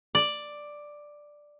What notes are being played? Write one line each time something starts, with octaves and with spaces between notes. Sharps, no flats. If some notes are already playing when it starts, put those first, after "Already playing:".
D5